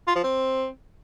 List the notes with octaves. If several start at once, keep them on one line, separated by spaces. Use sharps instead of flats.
F4
F3
C4